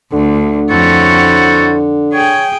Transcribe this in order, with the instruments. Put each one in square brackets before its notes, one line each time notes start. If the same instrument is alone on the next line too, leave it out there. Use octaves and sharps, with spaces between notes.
[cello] D2 [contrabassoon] D3
[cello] F2 C#5 [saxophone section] E4 F#4 C5 [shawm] A4
[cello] G#4 G5 [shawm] C#5